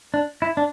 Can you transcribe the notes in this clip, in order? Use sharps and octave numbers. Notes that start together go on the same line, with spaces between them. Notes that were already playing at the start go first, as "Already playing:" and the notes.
D4
E4
D4